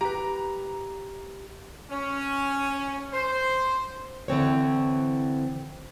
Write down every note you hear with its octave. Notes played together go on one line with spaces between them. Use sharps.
G4 B4 A#5
C#4
C5
D3 E3 C4 C#5